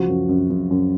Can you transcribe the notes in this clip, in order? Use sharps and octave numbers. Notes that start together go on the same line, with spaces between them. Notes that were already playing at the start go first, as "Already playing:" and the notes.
Already playing: C#2 F3 F#4
F#2
F#2
F#2
F#2